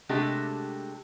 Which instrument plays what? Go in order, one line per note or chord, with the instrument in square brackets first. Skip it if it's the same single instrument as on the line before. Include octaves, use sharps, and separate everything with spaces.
[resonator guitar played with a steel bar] C3 G#3 A3 D4 F#4 G4